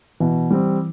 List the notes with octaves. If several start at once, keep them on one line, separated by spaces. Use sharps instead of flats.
B2 E3
G3 C4